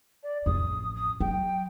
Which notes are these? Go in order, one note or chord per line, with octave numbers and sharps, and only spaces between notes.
D5
A1 F2 D#6
D#6
F#3 G5